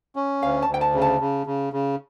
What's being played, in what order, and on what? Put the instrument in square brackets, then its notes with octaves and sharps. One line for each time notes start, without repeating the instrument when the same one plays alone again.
[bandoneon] C#4
[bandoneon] D2 [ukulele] F5
[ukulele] A5
[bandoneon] D2
[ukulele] G5
A5
[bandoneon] C#3
[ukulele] A5
[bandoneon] C#3
C#3
C#3